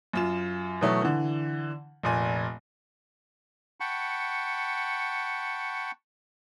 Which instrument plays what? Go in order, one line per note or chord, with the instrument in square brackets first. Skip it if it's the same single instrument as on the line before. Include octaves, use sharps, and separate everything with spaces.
[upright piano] F#2 F4 E7
B2 E3 F#3 A3
D3 E3
F1 A#2 G#5
[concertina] F#5 G5 A5 B5 C#6